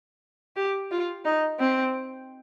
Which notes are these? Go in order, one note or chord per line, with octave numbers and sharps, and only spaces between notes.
G4
F4
D#4
C4